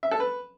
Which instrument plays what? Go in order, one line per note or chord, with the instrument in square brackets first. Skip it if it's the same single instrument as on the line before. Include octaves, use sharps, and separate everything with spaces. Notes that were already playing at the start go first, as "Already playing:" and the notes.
[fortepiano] E5
A4
B4